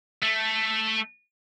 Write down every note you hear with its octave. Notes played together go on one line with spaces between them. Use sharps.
A3